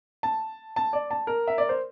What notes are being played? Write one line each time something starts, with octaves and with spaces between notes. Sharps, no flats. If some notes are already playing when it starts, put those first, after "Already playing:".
A5
A5
D5
A5
A#4
E5
D5
C5